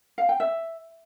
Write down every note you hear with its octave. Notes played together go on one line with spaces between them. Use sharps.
F5
G5
E5